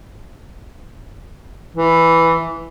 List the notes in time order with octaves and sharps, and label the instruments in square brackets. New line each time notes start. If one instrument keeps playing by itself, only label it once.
[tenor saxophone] E3